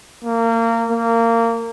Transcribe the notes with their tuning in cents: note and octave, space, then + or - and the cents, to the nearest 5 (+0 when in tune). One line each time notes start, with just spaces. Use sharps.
A#3 -25
A#3 -20